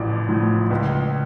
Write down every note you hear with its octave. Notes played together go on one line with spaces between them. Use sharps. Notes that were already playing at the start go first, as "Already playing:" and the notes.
Already playing: A1 A2 F3 D5
A2 F3
C#2